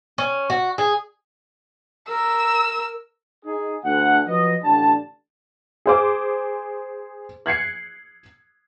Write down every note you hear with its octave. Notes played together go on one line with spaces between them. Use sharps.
C#4
F#4
G#4
A#4 E6
D#4 G#4
D2 F#5
F3 F#3 B4 D#5
A1 D3 D4 G4 A5
G#4 C5 D6
F#6 G#6 C7 C#7